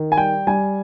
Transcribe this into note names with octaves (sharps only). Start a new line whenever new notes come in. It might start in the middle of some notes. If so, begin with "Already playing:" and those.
Already playing: D#3
G#5
G3 G5
G3 G#5